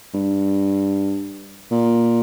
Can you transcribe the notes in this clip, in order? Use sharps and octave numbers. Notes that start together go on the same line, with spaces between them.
G2
A#2